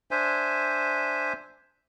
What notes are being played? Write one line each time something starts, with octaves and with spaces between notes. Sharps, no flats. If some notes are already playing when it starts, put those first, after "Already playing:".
D4 C5 E5 G#5